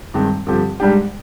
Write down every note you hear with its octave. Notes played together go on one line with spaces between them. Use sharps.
G2 D#3 G#3 C4
G2 D3 F3 C4 G4
G#2 G3 D4 G4